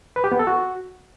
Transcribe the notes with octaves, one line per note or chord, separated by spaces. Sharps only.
B4
G4
B3
A4
F#4